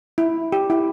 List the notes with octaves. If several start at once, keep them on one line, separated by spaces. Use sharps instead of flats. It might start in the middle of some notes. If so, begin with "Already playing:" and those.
E4
G4
E4